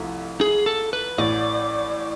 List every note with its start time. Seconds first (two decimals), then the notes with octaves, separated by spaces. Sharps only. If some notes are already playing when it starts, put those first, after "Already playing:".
Already playing: C2 C3 F3 A3 E4
0.41 G#4
0.66 A4
0.93 B4
1.18 A1 A2 E3 D5